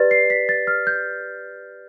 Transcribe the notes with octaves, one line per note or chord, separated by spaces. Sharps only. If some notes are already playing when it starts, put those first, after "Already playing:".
Already playing: G4 B4 D5 A6
C7
B6
A6
F6
G6